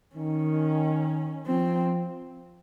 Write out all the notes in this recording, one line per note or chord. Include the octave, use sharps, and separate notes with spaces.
D#3 C#4
F3 C4